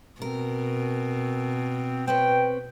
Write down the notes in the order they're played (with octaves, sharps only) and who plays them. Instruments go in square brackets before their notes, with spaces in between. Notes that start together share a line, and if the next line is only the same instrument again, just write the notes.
[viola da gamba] B2 [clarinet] C4 [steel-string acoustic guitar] A#4
[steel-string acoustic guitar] C4 B4 C#5 [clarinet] G5